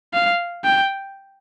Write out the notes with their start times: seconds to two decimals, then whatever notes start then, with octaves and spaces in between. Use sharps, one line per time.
0.14 F5
0.64 G5